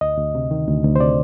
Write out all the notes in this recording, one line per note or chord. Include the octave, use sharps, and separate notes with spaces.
D2 D#5
D2
C3
D#3
D2
D2
C5
C3 D5